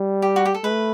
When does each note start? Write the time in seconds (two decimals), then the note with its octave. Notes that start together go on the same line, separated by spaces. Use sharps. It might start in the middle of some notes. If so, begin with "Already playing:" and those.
Already playing: G3
0.22 G4
0.36 F#4
0.45 G4
0.54 A4
0.64 A3 B4